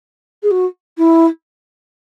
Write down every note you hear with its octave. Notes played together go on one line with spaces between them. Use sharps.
G#4
F#4
E4